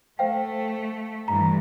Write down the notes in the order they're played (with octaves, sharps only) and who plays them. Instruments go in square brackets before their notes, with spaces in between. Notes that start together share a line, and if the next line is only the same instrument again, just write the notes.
[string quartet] A3 [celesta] C5 F5 G5
[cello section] G2 E3 [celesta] A#5